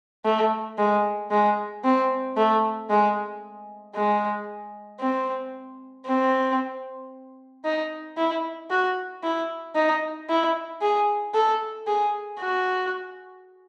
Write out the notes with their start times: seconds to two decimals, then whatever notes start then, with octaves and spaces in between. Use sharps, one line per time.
0.25 A3
0.78 G#3
1.31 G#3
1.84 C4
2.37 A3
2.90 G#3
3.95 G#3
5.00 C4
6.06 C4
7.65 D#4
8.17 E4
8.70 F#4
9.23 E4
9.75 D#4
10.29 E4
10.82 G#4
11.34 A4
11.87 G#4
12.40 F#4